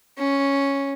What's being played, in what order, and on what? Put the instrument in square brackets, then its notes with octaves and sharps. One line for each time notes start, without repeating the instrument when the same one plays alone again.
[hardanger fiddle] C#4